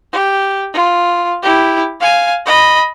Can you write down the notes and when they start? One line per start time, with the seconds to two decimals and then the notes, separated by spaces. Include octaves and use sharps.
0.13 G4
0.74 F4
1.43 E4 G4
2.00 F5 G#5
2.46 D#5 B5